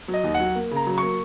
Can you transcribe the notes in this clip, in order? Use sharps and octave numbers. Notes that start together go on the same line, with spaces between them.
F#3
D#5
D#2
F#5
F#3
A#3
C#3
A#5
F#3
C#6
A#3